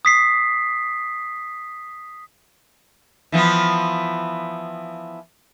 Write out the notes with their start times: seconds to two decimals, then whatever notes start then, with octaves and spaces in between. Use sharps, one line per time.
0.05 D#6 B6 C7
3.32 E3 F3 B3